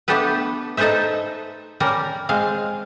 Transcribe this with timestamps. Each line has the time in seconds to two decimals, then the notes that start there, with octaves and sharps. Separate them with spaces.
0.08 A3 B3 D4 G4 A4 B4
0.77 D#4 A4 B4 C5 E5
1.80 G3 C#4 A#4
2.29 G#3 C4 F5